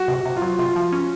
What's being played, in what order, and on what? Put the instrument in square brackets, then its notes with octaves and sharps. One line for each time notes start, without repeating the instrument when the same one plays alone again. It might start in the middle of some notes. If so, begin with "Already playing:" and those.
Already playing: [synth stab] F#3 [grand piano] F#4
[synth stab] C3
[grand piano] F#4
[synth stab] C3
[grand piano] F4
[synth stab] F#3
[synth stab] C3 [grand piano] F4
[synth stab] F3
C#4